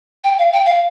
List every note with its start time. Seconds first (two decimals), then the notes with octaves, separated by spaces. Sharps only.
0.24 G5
0.38 F5
0.52 G5
0.65 F5